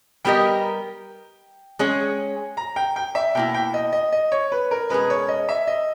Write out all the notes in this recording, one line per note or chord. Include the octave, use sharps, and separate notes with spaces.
G3 B3 G4 A#4 D#5 G5
G#3 C#4 G#4 C#5
A#5
G5
G5
E5
B2 A#3 E4 G5
G5
D#5
D#5
D#5
C#5
B4
A#4
B2 G#3 C#4 G#4 B4
C#5
D#5
E5
D#5